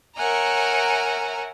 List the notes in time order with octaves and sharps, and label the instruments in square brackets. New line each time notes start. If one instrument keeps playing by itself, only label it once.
[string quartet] A#4 C#5 E5 F#5 G#5 A#5